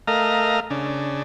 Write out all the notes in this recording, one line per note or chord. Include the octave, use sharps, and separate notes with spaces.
A3 A#4 D#5 F5 A#5
C#3 D4